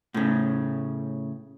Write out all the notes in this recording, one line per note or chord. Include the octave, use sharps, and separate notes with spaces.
A2 C#3